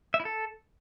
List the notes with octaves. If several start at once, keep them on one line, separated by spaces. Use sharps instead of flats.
E5
E4
A4